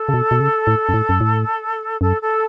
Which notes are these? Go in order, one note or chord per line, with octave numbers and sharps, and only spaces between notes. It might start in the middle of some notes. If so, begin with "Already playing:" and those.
Already playing: A4
C#3
B2
B2
C#3
A2
F#2
A2
F#2
A2
F#2 A4
A4